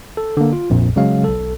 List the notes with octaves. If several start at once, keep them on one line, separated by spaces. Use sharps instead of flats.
A4
D3 A#3
F4
A#1 F2 A#2
C#3 F#3 G#3 F5
B1 A4